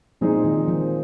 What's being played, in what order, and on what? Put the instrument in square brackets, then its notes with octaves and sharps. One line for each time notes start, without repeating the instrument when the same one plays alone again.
[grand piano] A#2 G#3 C4 D#4 G#4 [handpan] F3
[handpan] D#3
F3